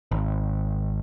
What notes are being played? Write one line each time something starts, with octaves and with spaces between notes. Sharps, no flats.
G#1